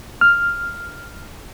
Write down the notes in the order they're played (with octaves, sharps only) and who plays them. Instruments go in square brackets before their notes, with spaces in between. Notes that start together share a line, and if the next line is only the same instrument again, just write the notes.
[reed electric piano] F6